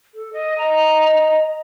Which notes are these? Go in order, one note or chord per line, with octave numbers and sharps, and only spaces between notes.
A4
D#5
D#5 A#5